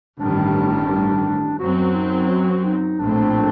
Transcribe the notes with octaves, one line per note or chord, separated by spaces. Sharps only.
A1 G2 D#3 G3 D4
F#2 F#3 C4 F#4
D#4
F#4
D#4
A#1 A2 A3 C4 D4